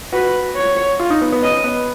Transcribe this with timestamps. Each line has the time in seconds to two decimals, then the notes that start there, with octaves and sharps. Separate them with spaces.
0.13 F#4 B4
0.56 C#5
1.00 F4
1.10 D#4
1.21 B3
1.32 B3
1.43 C#4 D#5
1.64 B3